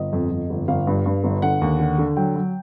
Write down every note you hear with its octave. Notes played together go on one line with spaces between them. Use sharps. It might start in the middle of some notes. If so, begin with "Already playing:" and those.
Already playing: G1 D#5
F2
F2
G1
G1 F5
G2
G2
G1
D3 F#5
D#2
D3
D3
F#3 G5
F#3